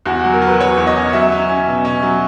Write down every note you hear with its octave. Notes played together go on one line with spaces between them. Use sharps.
E2 F#4
F#3 F#4
A#4
F#3
B4
F#3 C#5
E2
D#5
C#4
F#3 E5
C#4
C#4
B2
C#4
F#3